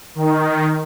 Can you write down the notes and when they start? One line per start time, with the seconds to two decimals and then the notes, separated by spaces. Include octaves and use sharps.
0.15 D#3